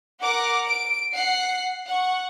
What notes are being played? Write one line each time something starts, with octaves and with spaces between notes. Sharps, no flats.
A#4 F#5 D6
D7
F#5 C7
F#5 C#6